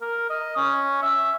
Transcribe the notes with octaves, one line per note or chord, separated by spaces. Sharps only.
A#4
D#5
C#4
E5